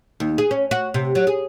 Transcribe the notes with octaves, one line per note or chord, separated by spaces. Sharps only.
D#2
G#4
C#4
F#4
C3
F#3
G#4